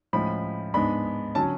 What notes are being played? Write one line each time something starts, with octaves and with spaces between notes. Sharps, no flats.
A2 F3 G#3 C#4 B5
G#2 G#3 B3 D4 B5
D3 F#3 C#4 A5